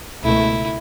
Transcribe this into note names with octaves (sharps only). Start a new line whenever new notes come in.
C#2 B2 A3 E4